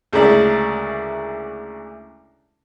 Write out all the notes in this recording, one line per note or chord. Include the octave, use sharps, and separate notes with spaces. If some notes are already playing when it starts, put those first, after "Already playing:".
D2 C#3 G#3 E4 A#4 D5